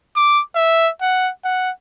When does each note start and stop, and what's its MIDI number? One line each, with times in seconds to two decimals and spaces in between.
0.16 0.41 86
0.55 0.89 76
1.02 1.30 78
1.45 1.70 78